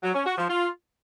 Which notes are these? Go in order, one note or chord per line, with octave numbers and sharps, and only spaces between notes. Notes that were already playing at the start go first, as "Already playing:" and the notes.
F#3
C#4
F#4
F3
F4